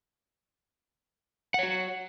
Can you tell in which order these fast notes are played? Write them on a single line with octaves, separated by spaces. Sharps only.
F#5 C#5 F#4